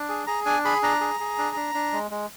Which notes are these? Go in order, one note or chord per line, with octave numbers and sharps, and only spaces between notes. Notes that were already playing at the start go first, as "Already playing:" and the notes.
Already playing: D4
G#4
G#4 A#5
D4 G#5
G#4 B5
D4 A#5
G#4
G#4
D4
D4
D4
G#3
G#3